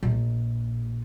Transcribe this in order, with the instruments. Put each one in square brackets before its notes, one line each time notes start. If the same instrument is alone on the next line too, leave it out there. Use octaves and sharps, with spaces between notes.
[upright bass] A#1